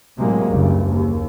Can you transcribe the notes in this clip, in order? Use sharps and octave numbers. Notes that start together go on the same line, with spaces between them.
A2 C3 F#3 G#3 A#3
F#1 C#2 G2
D#2